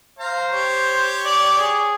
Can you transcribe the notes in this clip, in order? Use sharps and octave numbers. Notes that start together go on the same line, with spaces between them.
C5 F5 A#5
G4 C#5
D5
G#4